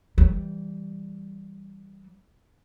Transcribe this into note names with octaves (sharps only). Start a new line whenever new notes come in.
E3 G3